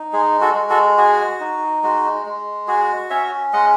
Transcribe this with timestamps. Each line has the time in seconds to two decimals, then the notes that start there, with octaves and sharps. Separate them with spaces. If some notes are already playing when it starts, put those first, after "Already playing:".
Already playing: D#4
0.13 G#3 G#4
0.41 F#4 A4
0.55 G#3
0.70 F#4 A4
0.98 F#4 G#4
1.40 D#4
1.83 G#3 F#4
2.26 G#3
2.68 F#4 G#4
3.10 C#4 C#5 E5
3.53 G#3 D#5 F#5